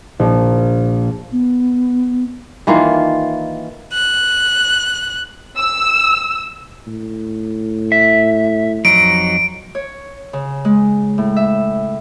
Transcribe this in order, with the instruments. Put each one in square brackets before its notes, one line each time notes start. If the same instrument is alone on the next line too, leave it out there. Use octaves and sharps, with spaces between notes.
[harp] A#1
[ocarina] B3
[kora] D#3 E3 A#3 F4
[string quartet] F#6
[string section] E6
[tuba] A2
[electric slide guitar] E5
[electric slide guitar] F2 F#3 D#4 [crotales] D7
[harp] C#5
C#3
G#3
A2
E5